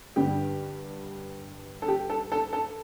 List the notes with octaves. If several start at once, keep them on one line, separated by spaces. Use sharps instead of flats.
G2 D3 G3 G4
A4
G4
A4
A4
A4